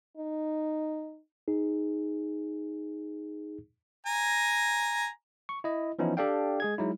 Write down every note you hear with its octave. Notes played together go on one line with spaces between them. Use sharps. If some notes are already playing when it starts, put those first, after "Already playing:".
D#4
D#4 G#4
G#5 A#5
C#6
E4 D#5
E3 F3 B3 C#4 D#4 E4
D4 G4 A4 D5 F5 G5
G#3 G#4 G#6
F#3 G#3 D#4 E4